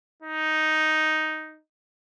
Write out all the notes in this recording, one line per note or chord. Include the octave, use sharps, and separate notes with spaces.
D#4